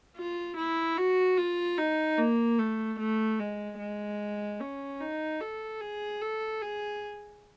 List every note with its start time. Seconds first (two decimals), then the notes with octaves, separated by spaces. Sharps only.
0.17 F4
0.57 E4
0.97 F#4
1.37 F4
1.78 D#4
2.18 A#3
2.59 A3
2.99 A3
3.39 G#3
3.79 G#3
4.60 C#4
5.00 D#4
5.41 A4
5.81 G#4
6.21 A4
6.61 G#4